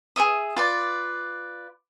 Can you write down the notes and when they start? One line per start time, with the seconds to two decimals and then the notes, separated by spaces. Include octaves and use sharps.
0.16 G#4 C#5 E5 D#6
0.56 F4 B4 D5